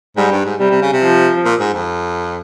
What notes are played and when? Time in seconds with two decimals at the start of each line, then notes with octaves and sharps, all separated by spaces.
0.17 G#2 G3
0.32 G2
0.45 G#2
0.60 C3 G3
0.70 C3
0.81 C#3
0.92 C3
1.02 F3
1.45 A#2
1.60 G#2
1.74 F2